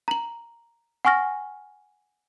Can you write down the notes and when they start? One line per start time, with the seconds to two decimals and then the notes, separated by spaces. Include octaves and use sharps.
0.08 A#5 F#7
1.05 F#5 G#5 C#6 F6 A#6